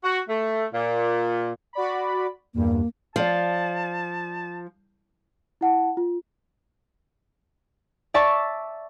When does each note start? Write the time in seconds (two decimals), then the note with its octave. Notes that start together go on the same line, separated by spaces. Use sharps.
0.04 F#4
0.29 A3
0.73 A#2
1.73 F#4 D5 B5
2.54 E2 G2 A#3
3.16 F3 D5 F5 A5
5.61 E4 F#5 A5
5.97 F4
8.14 D5 E5 A5 C#6 E6